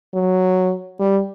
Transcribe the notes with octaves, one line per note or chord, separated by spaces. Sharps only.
F#3
G3